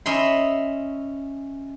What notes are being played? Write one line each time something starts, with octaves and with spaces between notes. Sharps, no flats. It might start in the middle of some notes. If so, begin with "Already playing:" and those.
C#4 D#5 E5 B5 C6